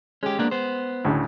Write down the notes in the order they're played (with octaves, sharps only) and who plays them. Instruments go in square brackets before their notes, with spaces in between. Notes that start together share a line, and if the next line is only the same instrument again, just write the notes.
[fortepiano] G#3 [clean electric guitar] C#4 G4
[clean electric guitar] A#3 B3 D4
B3 C5
[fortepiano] D2 A2 C#3